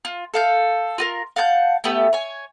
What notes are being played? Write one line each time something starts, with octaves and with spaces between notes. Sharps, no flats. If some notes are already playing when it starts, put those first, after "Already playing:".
F4
A4 F5 G6
F4 F#4 A#4
F5 F#5 A5 G6
A3 B3 G4
C#5 G#5